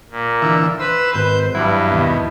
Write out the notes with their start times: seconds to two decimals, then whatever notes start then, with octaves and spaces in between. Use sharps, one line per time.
0.11 A#2
0.42 D3 E3 E5
0.79 B4 C5 E6
1.13 G#1 B4 G6
1.55 G2 F#3 E4
1.91 D#2 B2